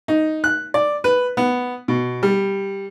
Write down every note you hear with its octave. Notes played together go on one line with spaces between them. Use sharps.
D#4
F#6
D5
B4
B3
B2
G3